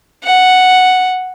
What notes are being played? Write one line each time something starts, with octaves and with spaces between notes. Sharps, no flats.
F#5